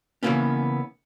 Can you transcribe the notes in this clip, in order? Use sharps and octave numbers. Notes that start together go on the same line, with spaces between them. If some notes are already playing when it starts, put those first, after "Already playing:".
C#3 E3 G3 A#3 B3 C#4